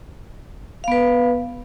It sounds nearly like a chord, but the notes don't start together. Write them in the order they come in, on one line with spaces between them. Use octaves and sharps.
F5 B3 B4